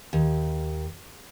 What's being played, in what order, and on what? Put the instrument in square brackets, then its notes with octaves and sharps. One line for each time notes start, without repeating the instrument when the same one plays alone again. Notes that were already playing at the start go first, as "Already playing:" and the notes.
[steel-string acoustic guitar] D#2